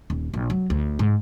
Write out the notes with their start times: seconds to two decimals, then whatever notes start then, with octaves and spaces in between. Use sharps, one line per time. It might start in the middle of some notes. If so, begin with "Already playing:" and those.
0.10 D#1
0.34 A#1
0.50 F#3
0.70 D2
0.99 G#2